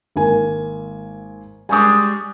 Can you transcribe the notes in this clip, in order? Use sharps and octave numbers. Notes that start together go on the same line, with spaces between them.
G#1 A#3 G#5
G3 G#3 G#5 C#6 D6